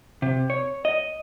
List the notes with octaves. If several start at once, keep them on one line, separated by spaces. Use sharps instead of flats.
C3
C#5
D#5